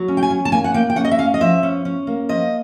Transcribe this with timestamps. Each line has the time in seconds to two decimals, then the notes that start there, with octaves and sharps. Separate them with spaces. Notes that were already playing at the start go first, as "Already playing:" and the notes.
Already playing: F#3
0.08 C#4
0.17 G5
0.23 G#5
0.30 C#4
0.45 A5
0.52 A#3 G#5
0.64 F#5
0.74 A#3 G5
0.90 G5
0.96 C#4 F#5
1.05 D#5
1.11 E5
1.18 C#4 F5
1.34 D#5
1.41 F3 E5
1.63 C#4
1.85 C#4
2.07 A#3
2.29 F3 D#5